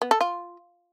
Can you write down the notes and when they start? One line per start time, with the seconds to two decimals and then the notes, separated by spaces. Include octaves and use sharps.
0.02 B3
0.11 A4
0.21 F4